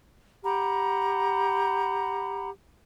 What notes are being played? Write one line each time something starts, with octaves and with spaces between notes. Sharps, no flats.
G4 F#5 A#5 B5